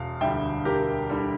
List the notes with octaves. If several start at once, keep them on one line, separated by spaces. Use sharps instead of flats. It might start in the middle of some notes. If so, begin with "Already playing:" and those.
Already playing: E1 F5
D2 D3 G3 E5 G5
E1 G4 A#4
D3 G3